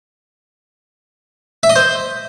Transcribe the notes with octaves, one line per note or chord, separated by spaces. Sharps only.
E5
D#5
C5